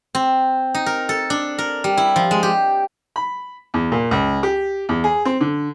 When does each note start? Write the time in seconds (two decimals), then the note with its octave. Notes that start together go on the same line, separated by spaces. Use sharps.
0.15 C4
0.74 D#4
0.86 A#4
1.09 A4
1.30 D4
1.58 A#4
1.84 G3
1.97 E4
2.16 F3
2.31 G#3
2.43 G4
3.16 B5
3.74 E2
3.92 A#2
4.11 C#2
4.43 G4
4.89 E2
5.04 G#4
5.25 C4
5.41 D3